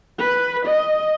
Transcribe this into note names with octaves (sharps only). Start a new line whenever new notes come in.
B4
D#5